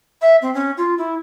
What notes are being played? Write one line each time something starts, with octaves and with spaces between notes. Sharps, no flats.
E5
C4
C#4
F4
E4